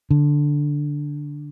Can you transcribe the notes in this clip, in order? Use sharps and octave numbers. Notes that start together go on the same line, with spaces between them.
D3